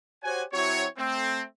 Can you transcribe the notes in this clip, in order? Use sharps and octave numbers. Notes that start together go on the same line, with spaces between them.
F#4 G4 C5 C#5 F#5 G#5
F#3 C4 E4 F#4 C#5
A3 C4